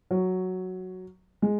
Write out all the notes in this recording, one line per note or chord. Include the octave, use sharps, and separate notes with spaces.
F#3
G#3